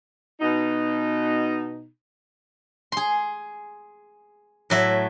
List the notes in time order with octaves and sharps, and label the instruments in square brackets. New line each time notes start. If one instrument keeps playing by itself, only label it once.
[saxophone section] B2 D#4
[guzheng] G#4 C6
A2 F#3 E5